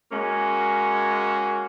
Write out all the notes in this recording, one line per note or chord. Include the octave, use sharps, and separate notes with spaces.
G#3 A#3 C#4 F#4